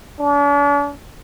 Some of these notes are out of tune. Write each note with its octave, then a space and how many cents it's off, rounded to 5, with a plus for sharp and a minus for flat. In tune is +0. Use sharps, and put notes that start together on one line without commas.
D4 -45